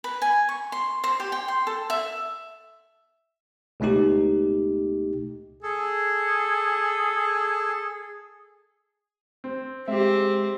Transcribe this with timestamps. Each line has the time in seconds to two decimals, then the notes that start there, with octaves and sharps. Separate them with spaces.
0.04 B4
0.22 G#5
0.49 C#6
0.72 C6
1.04 C5
1.20 G4
1.32 G5
1.48 C6
1.67 A4
1.90 E5
3.80 C#2 B2 A3 D#4 G4
5.63 G#4 A4
9.44 C4
9.88 G#3 C4 G4 E5